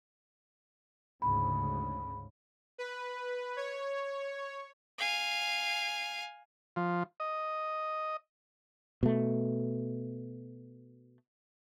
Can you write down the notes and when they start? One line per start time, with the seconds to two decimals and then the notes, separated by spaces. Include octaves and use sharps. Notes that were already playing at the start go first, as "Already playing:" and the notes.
1.22 D2 G#2 C#3 B5
2.78 B4
3.57 C#5
4.98 F5 G#5
6.76 F3
7.20 D#5
9.03 B2 A3